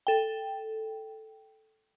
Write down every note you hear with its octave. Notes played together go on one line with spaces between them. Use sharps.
A4 G5